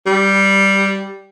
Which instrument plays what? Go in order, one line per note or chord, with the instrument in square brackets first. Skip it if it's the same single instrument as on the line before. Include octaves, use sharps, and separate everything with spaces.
[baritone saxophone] G3